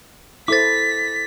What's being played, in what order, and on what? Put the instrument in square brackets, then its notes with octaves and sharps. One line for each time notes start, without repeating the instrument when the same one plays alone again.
[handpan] E4 A4 C5 [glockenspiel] D6 A6 [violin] B6